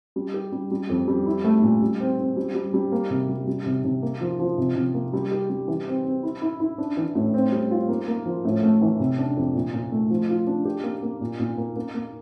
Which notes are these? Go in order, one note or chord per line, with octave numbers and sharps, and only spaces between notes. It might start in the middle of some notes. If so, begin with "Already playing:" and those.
G3
G4
G3
G3
F2
G3
E4
A3
A#2
G3
C4
C4
G3
G3
G3
A#3
C3
G3
G3
C3
C3
A#3
F3
F3
C3
C3
A#3
G3
G4
G3
E3
C4
C4
E4
E4
E4
D4
E3
A2
C4
G3
F4
A#3
A#3
F3
A2
A3
E3
C3
D4
F2
A#2
A#2
A3
F3
F4
D4
G4
A#3
A#3
A#2
A#2
A#3
A#3
A#3